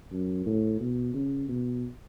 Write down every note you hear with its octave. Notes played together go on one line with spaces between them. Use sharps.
F#2
A2
B2
C#3
B2